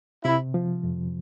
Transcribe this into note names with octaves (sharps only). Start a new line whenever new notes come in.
C3 E4
F3
F2